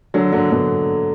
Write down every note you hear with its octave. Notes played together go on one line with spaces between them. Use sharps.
D3 F#3
D3 F#3
B2 D3